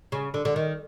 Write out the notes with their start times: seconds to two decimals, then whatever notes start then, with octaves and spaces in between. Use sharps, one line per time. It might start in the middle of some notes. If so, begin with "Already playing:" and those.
0.12 C#3
0.34 D3
0.45 D3
0.56 D#3